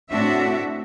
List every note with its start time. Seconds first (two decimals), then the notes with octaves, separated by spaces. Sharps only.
0.10 A2 C4 D4 F#4 E5